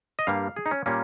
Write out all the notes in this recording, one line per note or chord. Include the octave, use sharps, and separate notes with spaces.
D#5
G2 G3 A#3 F5
G#4
D#4
C#4
A#2 G3 A#3 C#4